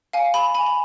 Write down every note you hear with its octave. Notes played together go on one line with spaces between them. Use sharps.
F5 G#5
G#5 B5
G#5 B5
B5